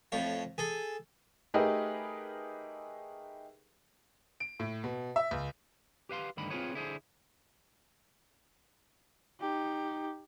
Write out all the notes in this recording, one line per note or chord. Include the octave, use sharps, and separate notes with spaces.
F2 A2 C#5 F5
G#4 A4
A3 D#4 G4 G#4 A#4 B4
D7
A2
B2
E5
C#2
G4 B4 F5 C6
D2 G2 D3 D#3 B5
C4 F4 G4 G#4 B4 C#5
D3 E4 G#4 C5
D#4 G4